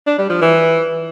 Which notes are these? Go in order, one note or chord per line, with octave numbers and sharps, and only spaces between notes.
D4
G3
F3
E3